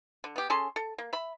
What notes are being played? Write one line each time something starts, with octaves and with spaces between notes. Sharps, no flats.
D3
B3 G4
C#4 G#4 A4 C6
A4
A#3
E5 B5